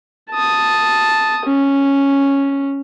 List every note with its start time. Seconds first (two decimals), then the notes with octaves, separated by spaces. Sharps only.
0.31 A5 D#6
1.45 C#4